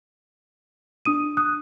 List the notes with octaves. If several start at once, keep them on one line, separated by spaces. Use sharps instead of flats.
D4 D#6 D#7
D#6 F#6